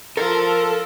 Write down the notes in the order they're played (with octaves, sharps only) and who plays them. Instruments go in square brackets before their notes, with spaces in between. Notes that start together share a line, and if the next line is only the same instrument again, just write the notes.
[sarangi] F3 [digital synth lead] A4 [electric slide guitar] A#4